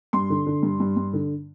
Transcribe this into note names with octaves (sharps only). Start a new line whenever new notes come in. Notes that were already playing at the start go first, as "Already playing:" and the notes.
G2 C6
D3
D3
G2
G2
G2
D3